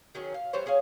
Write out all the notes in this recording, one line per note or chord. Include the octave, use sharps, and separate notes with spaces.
D#3 F#3 C#4 G#4
F5
E3 G3 C5 C#5
C#4 G#4 C#5 F5